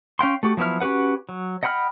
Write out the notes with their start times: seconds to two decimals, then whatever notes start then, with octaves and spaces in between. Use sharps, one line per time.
0.19 C#4 F5 G5 C6
0.43 A3 F#4 G4
0.57 F3 F#3 B3 E4 F6
0.80 C#4 F#4 G4 B4 F#5
1.29 F#3
1.63 D#5 F#5 G5 B5 F6